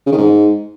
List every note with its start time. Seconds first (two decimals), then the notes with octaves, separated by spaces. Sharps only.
0.06 C#3
0.12 D#3
0.17 G#2